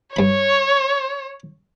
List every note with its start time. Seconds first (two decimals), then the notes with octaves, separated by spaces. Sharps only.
0.16 G2 C#5 B5